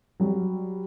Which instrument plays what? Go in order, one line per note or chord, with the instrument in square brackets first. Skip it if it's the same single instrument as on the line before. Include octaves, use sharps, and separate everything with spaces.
[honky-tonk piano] F#3 G3